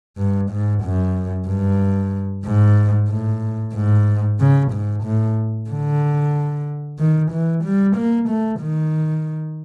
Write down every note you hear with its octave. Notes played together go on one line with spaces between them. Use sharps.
G2
G#2
F#2
G2
G#2
A2
G#2
C#3
G#2
A2
D3
D#3
E3
G3
A#3
A3
D#3